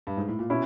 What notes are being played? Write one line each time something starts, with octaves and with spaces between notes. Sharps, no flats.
G2
G#2
A2
A#2
B2 C#4 E4